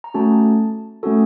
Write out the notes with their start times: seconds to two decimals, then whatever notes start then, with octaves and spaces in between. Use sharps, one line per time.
0.04 A#5
0.14 A3 C#4 F#4 A4 A5
1.03 A3 C#4 F#4 A4